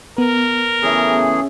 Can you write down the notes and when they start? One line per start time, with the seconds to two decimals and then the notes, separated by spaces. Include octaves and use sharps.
0.18 B3 A#4
0.83 C#3 E3 A3 C#4 G#4 E5